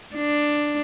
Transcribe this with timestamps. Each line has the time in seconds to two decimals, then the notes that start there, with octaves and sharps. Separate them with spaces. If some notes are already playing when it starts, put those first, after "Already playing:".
0.16 D4